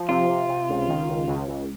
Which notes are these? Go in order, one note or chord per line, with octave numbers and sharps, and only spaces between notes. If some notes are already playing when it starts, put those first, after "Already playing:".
Already playing: F3
C3 F4
C3
C3
C#2
D#3
C#2
C#2
C#2